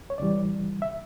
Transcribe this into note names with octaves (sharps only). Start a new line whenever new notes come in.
C#5
E2 C#3 E3 G3 D5
E5